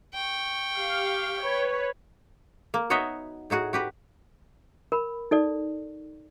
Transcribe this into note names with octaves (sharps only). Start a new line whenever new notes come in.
G5 C#6
G4 F5
B4 C#5
A#3
B3 D#4 F#4 C#5 D#5 E5
A2 D#4 F#4 G#4
F#4 G4 B4
A#4 B5
D#4 A4 D5